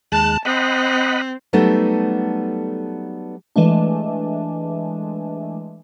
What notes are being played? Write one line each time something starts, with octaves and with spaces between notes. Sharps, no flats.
D#2 G#3 A5 F#6
C4 D#5 F#5 B5
F#3 G3 A3 B3 D#4 A4
E3 G#3 A3 D4